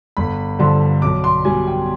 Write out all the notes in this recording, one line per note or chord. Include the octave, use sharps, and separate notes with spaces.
G1 B5
G2 D3 F3 C6
B1 D6
C6
B2 G3 G#5
G5